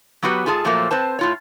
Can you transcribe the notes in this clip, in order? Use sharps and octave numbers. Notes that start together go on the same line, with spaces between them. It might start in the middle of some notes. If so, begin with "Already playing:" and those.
F#3 B3 F#4 G4 B4
G#2 F4 G#4 A4 A5
A#2 F3 F#3 A3 A#3 C5
C4 B4 C5 A5
A2 F4 C#5